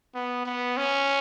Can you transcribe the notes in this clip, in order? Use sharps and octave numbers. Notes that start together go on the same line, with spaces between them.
B3
B3
C#4